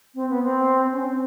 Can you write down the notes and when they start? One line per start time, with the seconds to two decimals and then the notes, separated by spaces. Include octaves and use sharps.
0.15 C4
0.29 B3
0.43 C4
0.92 C#4
0.99 C4